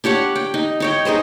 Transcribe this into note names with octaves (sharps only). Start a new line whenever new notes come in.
D4 G4 C#5 F#5
G5
D#4
D#4 C#5 G5
D#4 G#4 C5 D#5